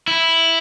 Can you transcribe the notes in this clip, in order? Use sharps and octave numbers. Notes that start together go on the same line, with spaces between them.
E4